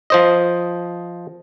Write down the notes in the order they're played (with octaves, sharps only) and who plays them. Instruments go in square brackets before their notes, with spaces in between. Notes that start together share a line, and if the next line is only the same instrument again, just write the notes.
[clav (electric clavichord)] F3 C5 D#5